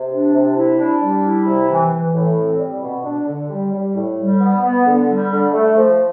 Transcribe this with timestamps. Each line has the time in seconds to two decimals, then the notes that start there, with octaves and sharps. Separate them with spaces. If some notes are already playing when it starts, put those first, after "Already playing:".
Already playing: C3
0.10 D4
0.33 C3
0.55 E4
0.78 D4
1.01 G3
1.23 E4
1.46 C3
1.68 E3
1.91 E3
2.14 A2
2.37 C4
2.59 G3
2.82 B2
3.04 D4
3.27 D3
3.50 G3
3.73 G3
3.95 A2
4.18 G3
4.40 B3
4.63 B3
4.86 D3
5.09 G3
5.31 D3
5.54 A3
5.77 F3